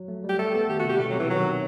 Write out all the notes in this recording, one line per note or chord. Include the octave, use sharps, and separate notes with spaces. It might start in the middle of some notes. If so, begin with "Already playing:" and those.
Already playing: F#3
A3
G3
G4
A3 A4
B3 A4
D#3 G4
F#4
C3 G4
G3
B2 A3
F#3
C3 E3
D#3 F#3